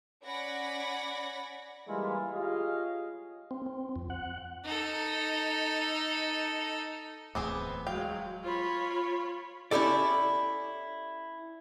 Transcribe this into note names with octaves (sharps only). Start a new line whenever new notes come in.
C#4 D5 F#5 B5 G#6 A#6
E3 G3 G#3 A#3 E4 F4
F4 G4 G#4 C#5 D#5 F5
C4
C4
F2
F#5
D#4 A4
D1 E2 A2 B3 C4 G#4 D6
F#3 G#3 F5 G5
F4 C#5 B5
C#4 E4 G4 A4 D5